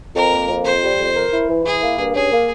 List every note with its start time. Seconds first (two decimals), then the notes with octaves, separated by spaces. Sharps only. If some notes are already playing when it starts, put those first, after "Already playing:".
0.15 F2 A#4
0.32 A#3
0.49 F2
0.65 F2 C5
0.82 G3
0.98 F2
1.16 A#4
1.32 E4
1.48 E3
1.64 E4 G#4
1.81 A#3
1.98 G2
2.14 C#4 G#4
2.32 A#3